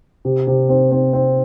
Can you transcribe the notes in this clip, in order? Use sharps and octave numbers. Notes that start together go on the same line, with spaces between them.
C3
C3
C4
C4
C4